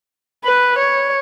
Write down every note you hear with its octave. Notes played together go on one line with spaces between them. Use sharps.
B4
C#5